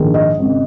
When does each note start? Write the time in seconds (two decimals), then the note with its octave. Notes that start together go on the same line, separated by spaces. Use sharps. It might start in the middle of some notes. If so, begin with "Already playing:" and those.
Already playing: A#1 G#2 D#3 G#3
0.14 D#5
0.39 G#1 C#3